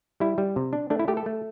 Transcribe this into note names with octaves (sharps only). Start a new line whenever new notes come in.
G3 E4
G3
C3
D4
A3 D4
E4
A3 G4
A4
A3